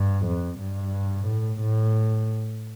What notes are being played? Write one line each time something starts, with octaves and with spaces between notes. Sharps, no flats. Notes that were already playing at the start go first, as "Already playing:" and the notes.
Already playing: G2
F2
G2
A2
A2